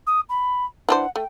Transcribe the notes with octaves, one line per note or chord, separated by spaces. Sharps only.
D#6
B5
E3 D4 C5 F#5
A3 G5